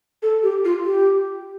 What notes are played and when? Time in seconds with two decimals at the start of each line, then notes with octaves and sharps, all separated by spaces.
0.22 A4
0.43 G4
0.65 F4
0.86 G4